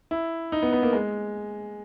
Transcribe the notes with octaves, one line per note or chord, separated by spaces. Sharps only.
E4
D#4
B3
B3
A#3
G#3